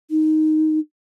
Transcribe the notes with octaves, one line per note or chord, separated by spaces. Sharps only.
D#4